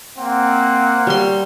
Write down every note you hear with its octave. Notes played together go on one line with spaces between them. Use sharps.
A#3 C4 F#5
F#3 G3 C6